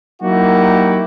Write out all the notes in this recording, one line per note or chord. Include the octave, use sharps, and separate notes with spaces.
F#3 A#3 D#4 E4 F#4 G4